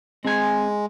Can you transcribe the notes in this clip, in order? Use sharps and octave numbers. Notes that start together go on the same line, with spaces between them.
G#3 C4 G#5